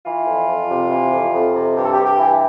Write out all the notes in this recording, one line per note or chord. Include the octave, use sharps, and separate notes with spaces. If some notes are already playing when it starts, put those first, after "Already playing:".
E3 F4
F2
F2
C3
E3
F2
F2
C3
G2 G4
A4
G4
G2
G4
E3